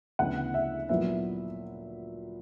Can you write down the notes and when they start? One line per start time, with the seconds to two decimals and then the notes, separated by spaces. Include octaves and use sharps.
0.19 D2 C#3 E3 B3 E4 F#5
0.54 E5
0.89 A#2 F#3 B3 E4 E5